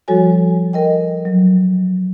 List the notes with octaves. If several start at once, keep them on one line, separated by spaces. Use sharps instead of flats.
F3 G3 F#4 A4 C#5 G#5
A#4 D#5 G5
F#3